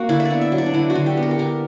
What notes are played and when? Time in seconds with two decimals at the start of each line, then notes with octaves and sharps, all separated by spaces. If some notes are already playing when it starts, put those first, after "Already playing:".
Already playing: A#3 F#4
0.09 D3 E4
0.20 E5
0.25 D5
0.30 B3
0.41 E5
0.52 F#3
0.58 D5
0.66 D4
0.74 D3 E4
0.90 F#4
0.95 D3
1.06 G4
1.17 B3
1.23 A#4
1.31 G4
1.39 D3 A#4